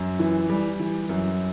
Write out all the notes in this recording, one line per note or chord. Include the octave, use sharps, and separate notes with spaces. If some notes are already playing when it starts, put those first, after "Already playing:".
Already playing: F#2
E3
G3
E3
F#2